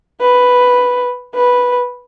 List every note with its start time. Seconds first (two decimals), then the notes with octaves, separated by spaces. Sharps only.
0.21 B4
1.35 B4